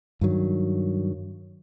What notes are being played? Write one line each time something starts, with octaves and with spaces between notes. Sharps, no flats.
G2 D#3 F#3